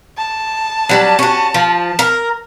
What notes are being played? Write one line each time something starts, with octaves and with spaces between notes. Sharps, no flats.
A5
F#3 G3 D4
C#4 F#4
F3
A#4